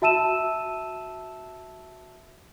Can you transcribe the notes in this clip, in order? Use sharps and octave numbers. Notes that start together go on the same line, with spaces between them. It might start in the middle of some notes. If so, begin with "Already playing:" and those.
F#4 E5 A5 E6 D#7 E7